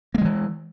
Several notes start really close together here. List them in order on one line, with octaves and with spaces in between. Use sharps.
A#3 G#3 F3 E3